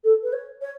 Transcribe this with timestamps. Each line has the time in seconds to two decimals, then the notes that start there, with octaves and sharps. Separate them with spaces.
0.04 A4
0.23 B4
0.33 C#5
0.61 C#5